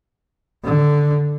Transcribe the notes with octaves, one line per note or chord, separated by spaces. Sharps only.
D3